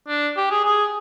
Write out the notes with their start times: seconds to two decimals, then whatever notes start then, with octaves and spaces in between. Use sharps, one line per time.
0.08 D4
0.37 G4
0.51 G#4
0.65 G#4